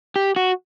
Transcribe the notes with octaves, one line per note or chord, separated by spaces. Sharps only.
G4
F#4